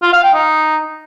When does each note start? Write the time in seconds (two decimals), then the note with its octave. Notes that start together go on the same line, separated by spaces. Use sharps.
0.03 F4
0.13 F5
0.23 G5
0.34 D#4